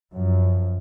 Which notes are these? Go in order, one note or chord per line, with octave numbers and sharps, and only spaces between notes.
F#2 F3